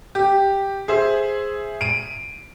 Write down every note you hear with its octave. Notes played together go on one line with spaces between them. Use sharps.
G4
G#4 C5 E5
D7 D#7